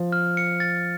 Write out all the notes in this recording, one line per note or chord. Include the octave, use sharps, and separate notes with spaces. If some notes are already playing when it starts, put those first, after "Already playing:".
Already playing: F3
F6
C#7
A6